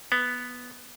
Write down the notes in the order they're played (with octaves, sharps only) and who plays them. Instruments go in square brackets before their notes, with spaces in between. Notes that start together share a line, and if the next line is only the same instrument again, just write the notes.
[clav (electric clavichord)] B3